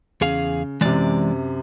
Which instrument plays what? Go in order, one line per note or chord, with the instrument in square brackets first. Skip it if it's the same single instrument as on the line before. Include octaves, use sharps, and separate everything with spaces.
[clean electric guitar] E2 G#4 F5 [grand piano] C#3
[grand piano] F#2 C3 [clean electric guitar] E3 G#3 D5